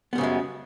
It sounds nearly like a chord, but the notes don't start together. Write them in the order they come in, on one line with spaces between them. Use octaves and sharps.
B3 G3 C#3 F#2 G#3